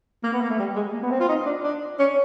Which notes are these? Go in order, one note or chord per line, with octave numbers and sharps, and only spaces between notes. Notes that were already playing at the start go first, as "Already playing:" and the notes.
A#3
B3
A#3
A3
G3
G#3
A#3
B3
C4
F4
D#4
D4
D4
C#4